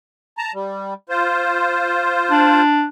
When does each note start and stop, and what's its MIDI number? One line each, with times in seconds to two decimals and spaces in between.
0.38 0.52 81
0.38 0.52 82
0.54 0.94 55
1.09 2.62 65
1.09 2.62 72
2.31 2.86 62